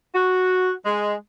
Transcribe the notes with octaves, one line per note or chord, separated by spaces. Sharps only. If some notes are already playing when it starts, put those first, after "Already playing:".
F#4
G#3